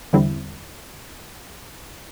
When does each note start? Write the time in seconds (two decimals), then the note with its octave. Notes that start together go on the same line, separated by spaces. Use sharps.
0.13 E2 D3 G3 C4 E4